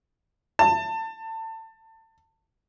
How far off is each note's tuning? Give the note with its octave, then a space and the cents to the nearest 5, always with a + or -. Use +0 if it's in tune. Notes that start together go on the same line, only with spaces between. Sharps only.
A5 +25